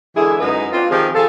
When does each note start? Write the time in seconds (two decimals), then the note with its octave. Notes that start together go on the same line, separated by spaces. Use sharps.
0.15 D3 E3 G#3 E4 G#4
0.40 F#2 G#3 D#4 B4
0.72 C4 D4 F4
0.90 C3 D#3 F3 C4 G#4
1.15 F4 G#4 A4